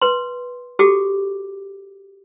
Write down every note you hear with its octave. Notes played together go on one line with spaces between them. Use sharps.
B4 C6
F#4 G4 A4 D6